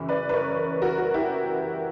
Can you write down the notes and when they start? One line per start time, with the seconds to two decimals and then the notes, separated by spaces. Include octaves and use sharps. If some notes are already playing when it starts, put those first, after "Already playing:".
Already playing: F#2 C#3 E3
0.09 B4 D5
0.29 B4
0.33 A#4 C#5
0.82 F#4 A#4
0.98 F#4
1.14 E4 G4